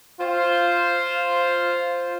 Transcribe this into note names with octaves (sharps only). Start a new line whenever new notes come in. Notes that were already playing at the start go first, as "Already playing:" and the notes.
F4 C5